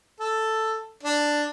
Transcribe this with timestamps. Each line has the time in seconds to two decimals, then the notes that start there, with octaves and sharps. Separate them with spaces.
0.20 A4
1.03 D4